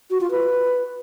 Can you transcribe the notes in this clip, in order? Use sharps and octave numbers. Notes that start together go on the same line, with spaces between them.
F#4
F4
B4